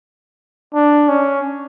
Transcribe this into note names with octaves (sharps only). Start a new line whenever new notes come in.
D4
C#4